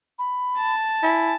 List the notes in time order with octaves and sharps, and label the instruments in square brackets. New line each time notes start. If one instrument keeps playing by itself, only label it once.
[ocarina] B5
[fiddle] A5
[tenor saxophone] E4 [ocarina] G#5